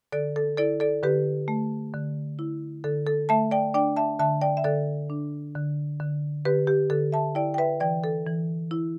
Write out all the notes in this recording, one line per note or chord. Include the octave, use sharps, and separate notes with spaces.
D3 A4 D5
A4
E4 A4 D5
A4 D5
D3 G4 B4
A3
D3
E4
D3 A4
A4
A3 E5 A5
D5 G5
D4 D5 G5
E5 A5
D3 E5 A5
D5 G5
E5
D3 A4 D5
D4
D3
D3
D3 G4 B4
G4
D3 A4
E5 A5
E4 D5 G5
G5
B4 E5
E3 D5 G5
A4
E3
E4